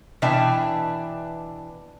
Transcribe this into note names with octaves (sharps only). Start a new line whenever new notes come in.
B2 E3 D4 E5 G5 A5